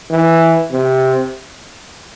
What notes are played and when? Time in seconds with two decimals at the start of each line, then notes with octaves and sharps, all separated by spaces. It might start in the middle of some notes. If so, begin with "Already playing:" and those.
0.11 E3
0.72 C3